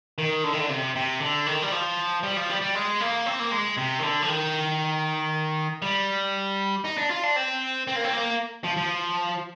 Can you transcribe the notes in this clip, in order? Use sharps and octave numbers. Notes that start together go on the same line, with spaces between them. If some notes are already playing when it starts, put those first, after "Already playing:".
D#3
D3
D#3
D3
C3
C3
D3
D#3
G3
F3
G3
F3
G3
G3
G#3
A#3
C4
A#3
G#3
C3
D#3
D3
F3
D#3
G3
D#4
D4
F4
D4
C4
C4
A#3
C4
A#3
F3
F3